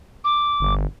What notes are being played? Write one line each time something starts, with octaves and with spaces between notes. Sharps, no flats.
D6
G1